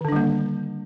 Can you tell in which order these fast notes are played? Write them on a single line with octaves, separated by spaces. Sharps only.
D#3 D3 D4 G3 A#3